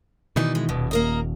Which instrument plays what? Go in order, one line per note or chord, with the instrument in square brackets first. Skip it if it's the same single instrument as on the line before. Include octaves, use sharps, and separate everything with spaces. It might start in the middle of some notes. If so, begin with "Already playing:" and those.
[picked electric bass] B2 D#3 E3 [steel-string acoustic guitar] D#4 D5
[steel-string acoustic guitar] G#3
[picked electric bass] D#1 [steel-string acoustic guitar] B2
[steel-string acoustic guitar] A#3 A#4 D#5